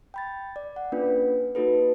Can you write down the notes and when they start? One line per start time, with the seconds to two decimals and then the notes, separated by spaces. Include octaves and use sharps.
0.14 G5 B5 A6
0.56 D5
0.76 F#5
0.92 A#3 C#4 D4 F4 B4
1.55 A#3 D#4 F#4 A4 B4